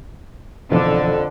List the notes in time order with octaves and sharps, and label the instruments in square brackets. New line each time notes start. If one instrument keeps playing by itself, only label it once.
[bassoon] F2 [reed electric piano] B2 E3 F3 [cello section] D3